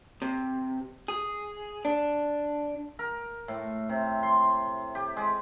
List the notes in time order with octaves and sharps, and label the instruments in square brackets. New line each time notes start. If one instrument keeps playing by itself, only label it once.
[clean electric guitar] C3
G#4
D4
[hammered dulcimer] A#4
A2
C3
C6
G4
G#3